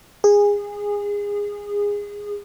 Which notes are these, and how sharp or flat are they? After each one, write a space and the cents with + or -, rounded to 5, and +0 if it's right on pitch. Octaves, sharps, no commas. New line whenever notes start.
G#4 -20